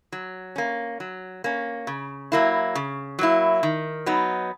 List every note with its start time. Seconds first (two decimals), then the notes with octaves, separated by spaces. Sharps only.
0.12 F#3
0.56 A#3 C#4
1.00 F#3
1.44 A#3 C#4
1.87 C#3
2.32 F#3 A#3 E4
2.75 C#3
3.19 F#3 A#3 E4
3.63 D#3
4.06 F#3 B3 D#4